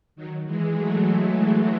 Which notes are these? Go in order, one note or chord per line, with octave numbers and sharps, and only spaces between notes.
D#3 F#3
E3 G#3
F#3 A3